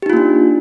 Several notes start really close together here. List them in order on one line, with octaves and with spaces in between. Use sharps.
G4 D#4 F4 A#3 D4